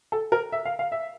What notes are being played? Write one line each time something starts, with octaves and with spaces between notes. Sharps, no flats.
A4
A#4
E5
F5
F5
E5